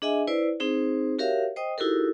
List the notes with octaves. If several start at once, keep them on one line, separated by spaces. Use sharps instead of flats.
D4 G#4 D#5 E5 G#5
E4 B4 C5 D5
C4 D#4 G#4 C5
F#4 G4 A#4 C#5 E5 F5
C5 D#5 G5 D#6
D#4 E4 F#4 G4 A4 A#4